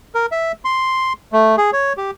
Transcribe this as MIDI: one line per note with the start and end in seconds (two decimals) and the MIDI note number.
0.15 0.26 70
0.32 0.52 76
0.65 1.13 84
1.33 1.56 57
1.58 1.71 68
1.73 1.93 73
1.97 2.11 67